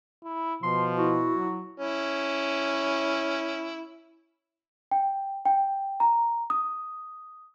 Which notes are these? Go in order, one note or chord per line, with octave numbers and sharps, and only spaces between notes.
E4
B2 F3 C6
E4 F#4
F#3
C#4 E4
G5
G5
A#5
D#6